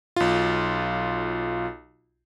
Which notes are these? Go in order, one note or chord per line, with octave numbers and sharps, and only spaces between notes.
B1 F4